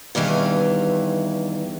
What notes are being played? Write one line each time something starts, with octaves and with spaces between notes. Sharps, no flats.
E2 G2 D#3 E3 F5